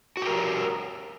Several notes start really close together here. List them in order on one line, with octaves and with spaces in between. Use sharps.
F#4 G4 A#4